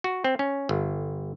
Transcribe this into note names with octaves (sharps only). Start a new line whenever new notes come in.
F#4
C4
C#4
G1